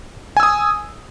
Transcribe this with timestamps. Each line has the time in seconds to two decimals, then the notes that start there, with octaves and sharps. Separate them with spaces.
0.37 G#5
0.40 E6
0.43 D#6